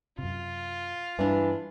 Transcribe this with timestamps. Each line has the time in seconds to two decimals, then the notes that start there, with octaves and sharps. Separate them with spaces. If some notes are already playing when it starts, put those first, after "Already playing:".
0.18 F#2 C3 F4
1.19 G2 E3 G3 D4